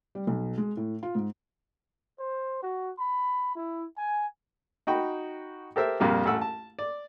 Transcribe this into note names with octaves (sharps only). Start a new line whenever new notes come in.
G3
B1
G#3
A2
F4
G#2
C5
F#4
B5
E4
G#5
D#4 F#4 G5 B5
G4 A4 A#4 C5 E5
A#1 F2 G3 A#3
A1 A3 F#5 E6
A5
D5